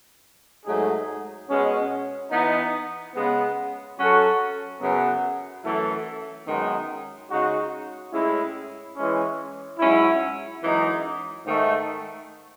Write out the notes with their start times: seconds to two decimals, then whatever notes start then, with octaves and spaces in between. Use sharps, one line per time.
0.66 G#2 F#3 A3 D#4 G#4
1.49 B2 G#3 C#4
2.31 E3 B3 D#4
3.15 C#3 G#3 B3
3.97 F#3 C#4 F#4 A4
4.80 F#2 C#3 F#3 B3
5.64 F#2 E3 A3 E4 A4
6.46 F#2 D#3 G#3 B3 D#4
7.30 C#3 G#3 D#4 F#4
8.13 A2 G#3 C#4 E4
8.96 E3 G#3 C#4
9.79 G#2 F#3 C#4 E4
10.62 F#2 E3 G#3 D#4
11.45 G#2 D#3 A3